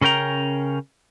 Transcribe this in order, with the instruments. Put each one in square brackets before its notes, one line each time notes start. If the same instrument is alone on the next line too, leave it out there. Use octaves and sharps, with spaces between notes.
[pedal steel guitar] C#3 C#4 A#4 G5 A#5